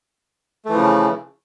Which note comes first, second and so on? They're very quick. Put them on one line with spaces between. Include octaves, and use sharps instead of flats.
A3 E3 F3 C#3